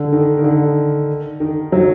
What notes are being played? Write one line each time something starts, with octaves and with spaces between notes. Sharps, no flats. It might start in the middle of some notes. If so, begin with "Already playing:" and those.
Already playing: D3
D#3
D#3
D3
D#3
F#3